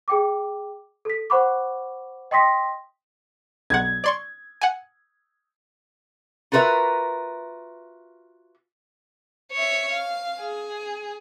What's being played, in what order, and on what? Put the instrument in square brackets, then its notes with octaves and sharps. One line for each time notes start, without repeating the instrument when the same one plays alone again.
[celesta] G#4 G5 D6
A4 B6
C5 F#5 B5 C#6 D6
D#5 G5 C6 D#6 A#6 B6
[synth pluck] B1 F#5 [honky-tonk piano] G#6
[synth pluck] D5 C6 C#6
F#5 G#5
[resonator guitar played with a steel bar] F4 F#4 A#4 B4 E5
[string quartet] C#5 E5
F5
G#4